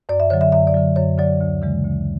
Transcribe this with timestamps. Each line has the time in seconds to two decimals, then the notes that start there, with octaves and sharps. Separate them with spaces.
0.09 F#2 D5
0.20 E5
0.30 D3 F#3 C#5
0.41 E5
0.52 F#2 E5
0.67 D5
0.74 D3 F#3
0.96 F#2 C#5
1.18 D3 F#3 D5
1.41 D2
1.62 C#3 E3 G#3
1.84 D2